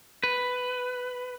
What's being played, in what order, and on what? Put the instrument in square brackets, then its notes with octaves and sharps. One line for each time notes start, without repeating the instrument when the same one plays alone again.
[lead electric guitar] B4